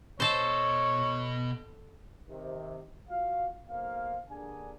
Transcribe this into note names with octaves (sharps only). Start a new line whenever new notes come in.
B2 A4 C5 C#5 D#5
C3 D#3
F4 F#4 F5
B1 A#3 C5 F5
D#2 D3 D4 G#4 A#4 G#5